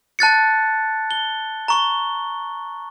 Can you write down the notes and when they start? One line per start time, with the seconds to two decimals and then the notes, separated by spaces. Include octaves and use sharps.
0.19 A5 F#6 A6 C#7
1.11 G7
1.68 A#5 C#6 G7